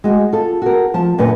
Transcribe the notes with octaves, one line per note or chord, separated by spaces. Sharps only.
G#3 F#4
F4 A4
F#4 A#4
F3 A5
F#2 A#2 D3 B3 B4